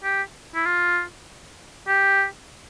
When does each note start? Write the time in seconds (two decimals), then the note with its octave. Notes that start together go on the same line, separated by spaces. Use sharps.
0.03 G4
0.55 E4
0.66 F4
1.88 G4